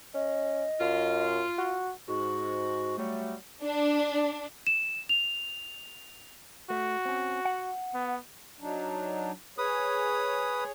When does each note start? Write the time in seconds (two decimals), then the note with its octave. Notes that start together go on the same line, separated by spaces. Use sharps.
0.15 C#4 D#5
0.81 F#2 F4
1.58 F#4
2.08 G#2 F#4
2.98 F#3 G3 A3
3.62 D4
4.67 E7
5.09 F7
6.70 A3 F#4
7.05 C4 C#4
7.45 F#5
7.94 B3
8.60 F#3 D4 D#4
9.58 G#4 B4 C#5 D#6